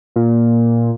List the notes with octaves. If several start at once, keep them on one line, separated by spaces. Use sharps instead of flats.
A#2